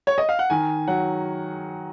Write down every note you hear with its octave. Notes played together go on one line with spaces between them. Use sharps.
C#5
D#5
F5
F#5
D#3 G#5
F#3 F#5